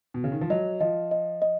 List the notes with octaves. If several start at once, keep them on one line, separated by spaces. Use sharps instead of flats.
B2
C#3
D#3
F3
F#3 D#5
F3 D#5
D#5
D#5